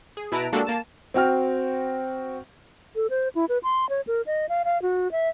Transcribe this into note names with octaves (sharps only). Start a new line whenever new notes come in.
G#4
B2 E4 B4 A5 A#5 D7
G#3 A#3 D4 F#4 G4 A4
A#3 A5 E7
C4 F#4 G5 F6
A4
C5
E4
B4
C6
C#5
A#4
D#5
F5
F5
F#4
E5